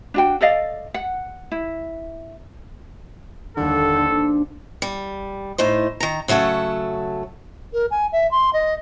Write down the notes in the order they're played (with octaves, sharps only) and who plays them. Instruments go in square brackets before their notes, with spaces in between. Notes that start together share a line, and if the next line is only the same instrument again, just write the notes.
[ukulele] D4 F#4 G5
A4 D5 D#5 F5
F#5
E4
[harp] D#2 G3 A#4 [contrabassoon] D3 [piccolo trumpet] A4
[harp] D4 C5
[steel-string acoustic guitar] G3
A2 D#4 C5
D#3 A#5
C#3 F#3 A3 A4 F#5
[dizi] A#4
G#5
E5
C6
D#5